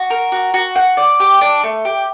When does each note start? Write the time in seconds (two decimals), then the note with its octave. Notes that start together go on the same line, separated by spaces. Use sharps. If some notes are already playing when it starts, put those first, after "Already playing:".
Already playing: F#4
0.10 A#4
0.32 F#4
0.54 F#4
0.76 F#5
0.97 D5
1.20 G4
1.41 D4
1.63 A3
1.85 G4